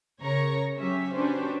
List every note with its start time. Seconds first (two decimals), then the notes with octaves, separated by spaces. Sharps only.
0.23 C#3 A#4 C#5 A#5 C#6
0.77 F#3 C#4 G4 E5
1.15 C#4 D4 F#4 G4 B4 C5